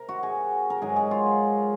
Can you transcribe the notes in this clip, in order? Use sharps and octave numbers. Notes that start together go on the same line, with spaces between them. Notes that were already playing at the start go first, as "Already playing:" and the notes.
Already playing: C3 A#4
F#4
G#4
A#4
G#2 F#3 G#4
G#4
F4